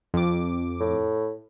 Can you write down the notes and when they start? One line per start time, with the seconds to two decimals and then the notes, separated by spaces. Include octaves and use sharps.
0.14 F2 D6
0.80 A2